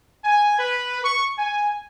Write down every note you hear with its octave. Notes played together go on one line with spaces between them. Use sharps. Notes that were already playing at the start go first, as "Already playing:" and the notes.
G#5
B4
C#6
G#5